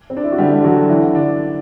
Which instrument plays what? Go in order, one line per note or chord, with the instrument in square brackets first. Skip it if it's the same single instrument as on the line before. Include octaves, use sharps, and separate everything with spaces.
[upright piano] C4
D4
E4
F#4
[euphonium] D3 [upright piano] G3 G4
[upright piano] F#3 F#4
E3 E4
D3 D4